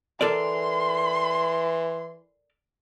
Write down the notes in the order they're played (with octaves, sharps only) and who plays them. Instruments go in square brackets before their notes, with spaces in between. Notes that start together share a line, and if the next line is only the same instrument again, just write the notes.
[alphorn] E3 [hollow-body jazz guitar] A4 A#4 D5 [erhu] C6